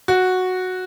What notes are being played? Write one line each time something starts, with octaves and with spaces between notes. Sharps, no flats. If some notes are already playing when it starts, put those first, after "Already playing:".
F#4